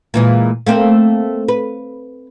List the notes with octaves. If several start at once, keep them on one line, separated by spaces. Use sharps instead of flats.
A#2 E3 G#3
A3 A#3 C4
B4